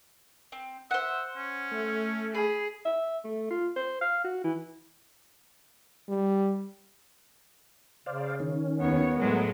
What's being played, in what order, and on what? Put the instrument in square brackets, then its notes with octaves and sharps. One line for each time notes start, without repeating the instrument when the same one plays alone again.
[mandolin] C4
[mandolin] C5 F#5 [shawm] E5
[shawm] C#4
[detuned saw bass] A3
[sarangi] G#4 [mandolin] B5
[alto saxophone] E5
A3
F4
C5
F5
F#4
E3
[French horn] G3
[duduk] C#3 [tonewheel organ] C5 D5 F5
[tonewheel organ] D#3 C#4
[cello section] D#2 C#5 [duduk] B3
[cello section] A2 F#3 G#3 [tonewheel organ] A#4